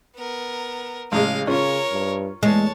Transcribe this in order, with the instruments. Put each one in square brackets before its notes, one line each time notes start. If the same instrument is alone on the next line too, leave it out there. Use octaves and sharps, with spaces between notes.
[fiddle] B3 A#4
[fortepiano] A1 G#3 [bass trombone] C#3 [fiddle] D#5 F5
[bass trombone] C#3 [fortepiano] C#4 F4 [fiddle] A#4 C#5
[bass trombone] G2
[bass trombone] E2 [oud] G#3 [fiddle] C#5 A5